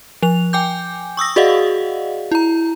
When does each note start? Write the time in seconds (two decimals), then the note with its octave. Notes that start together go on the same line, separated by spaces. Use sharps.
0.23 F3 F7
0.53 G5 G#5 D6 G6
1.17 C#6 D#6 E6 A#6
1.36 F#4 G#4 D5 D#5 F5 F#5
2.32 E4 A#5